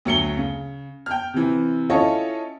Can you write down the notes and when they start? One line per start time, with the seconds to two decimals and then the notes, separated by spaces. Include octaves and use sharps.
0.05 D2 F#3 C#7 G7
0.37 C#3
1.06 G5 F6
1.34 C3 E3
1.90 C#4 E4 F4 A4 C#5 D#5